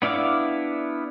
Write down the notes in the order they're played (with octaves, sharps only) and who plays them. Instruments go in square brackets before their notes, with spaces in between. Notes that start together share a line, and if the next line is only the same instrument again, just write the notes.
[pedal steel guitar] B3 D4 E4 F5 D6